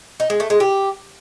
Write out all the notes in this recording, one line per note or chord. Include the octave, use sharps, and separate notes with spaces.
D#4
G#3
A3
G#3
G4